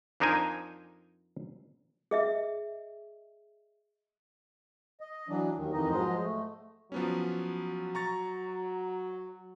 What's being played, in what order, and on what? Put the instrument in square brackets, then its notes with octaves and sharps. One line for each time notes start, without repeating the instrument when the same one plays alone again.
[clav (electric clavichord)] F2 D4 D#4 A#4 C5 G#5
[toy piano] G#4 D#5 E5
[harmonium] D#5
E3 F#3 D4
D#2 D#3
F2 D#3 E3 D#4 D#5
G#2 F3 F#3 G#3 C5 D#5
A3
[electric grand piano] F3 B3 C#4 [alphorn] F#3
[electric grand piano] A#5 C#6 A6